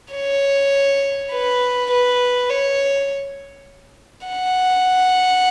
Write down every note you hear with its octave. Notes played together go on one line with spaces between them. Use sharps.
C#5
B4
B4
C#5
F#5